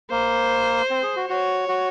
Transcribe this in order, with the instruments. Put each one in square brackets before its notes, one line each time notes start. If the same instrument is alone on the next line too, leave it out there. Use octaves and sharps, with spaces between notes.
[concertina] A#3 [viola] C5
[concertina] C4
G#4
F#4
[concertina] F#4 [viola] C#5
[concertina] F#4